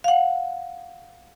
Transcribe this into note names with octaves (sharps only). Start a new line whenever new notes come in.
F5 F#5